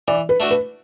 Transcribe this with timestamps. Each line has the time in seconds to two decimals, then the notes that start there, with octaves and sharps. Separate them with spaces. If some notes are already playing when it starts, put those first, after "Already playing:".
0.08 E3 D5
0.29 B4
0.40 A3 D4 F#4 A4
0.51 B4